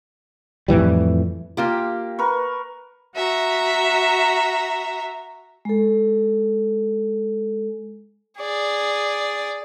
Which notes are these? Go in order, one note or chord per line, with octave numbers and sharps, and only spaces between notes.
F2 A2 E3 G3
A#3 F4 G4
A#4 B4 C#6
F#4 E5 A#5
G#3 A4
G#4 D5